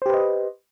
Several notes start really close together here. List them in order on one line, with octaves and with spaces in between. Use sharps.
C5 G4 B4 D#5